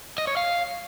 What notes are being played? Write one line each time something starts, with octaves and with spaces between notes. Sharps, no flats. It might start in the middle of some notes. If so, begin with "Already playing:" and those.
D#5
C#5
F5